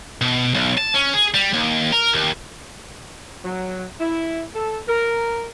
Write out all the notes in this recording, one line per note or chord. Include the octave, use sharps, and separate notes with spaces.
B2
B1
A5
C#4
G#4
G3
D#2
A#4
D#2
F#3
E4
A4
A#4